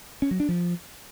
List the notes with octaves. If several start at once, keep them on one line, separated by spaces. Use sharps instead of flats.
C#4
F#3
D4
F3